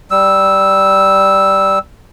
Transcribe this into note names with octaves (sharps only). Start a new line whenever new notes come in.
G3 E6